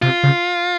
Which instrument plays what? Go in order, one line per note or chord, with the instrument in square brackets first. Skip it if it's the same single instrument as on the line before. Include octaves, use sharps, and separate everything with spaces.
[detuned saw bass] C3 [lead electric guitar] F4
[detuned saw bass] C#3